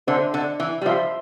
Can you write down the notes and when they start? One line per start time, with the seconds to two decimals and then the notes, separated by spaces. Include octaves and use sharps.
0.07 D3 C5 E5 A5 C6
0.34 D3
0.60 E3
0.81 G3
0.85 F3 C5 E5 A5 C6